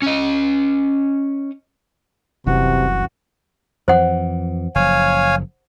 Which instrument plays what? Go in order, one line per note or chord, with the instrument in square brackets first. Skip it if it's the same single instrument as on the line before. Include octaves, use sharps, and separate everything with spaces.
[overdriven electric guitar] C#4 D#5
[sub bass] F1 [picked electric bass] C2 F#2 E3 [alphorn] C3 [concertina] F#4
[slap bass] F2 E3 [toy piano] C5 F#5
[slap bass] F#1 F3 [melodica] C#5 F5 G#5